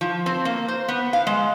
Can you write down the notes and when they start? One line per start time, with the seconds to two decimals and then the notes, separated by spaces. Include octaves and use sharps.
0.01 F3
0.26 C4
0.45 A#3
0.68 C5
0.89 B3
1.13 F5
1.27 G#3